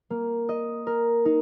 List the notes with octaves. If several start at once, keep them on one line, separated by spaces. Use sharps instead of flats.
A#3
D#5
A#4
D#4